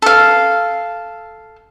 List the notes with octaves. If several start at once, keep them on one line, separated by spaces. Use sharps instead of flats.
A4 F5